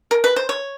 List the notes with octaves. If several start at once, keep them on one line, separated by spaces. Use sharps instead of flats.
A#4
B4
C5
C#5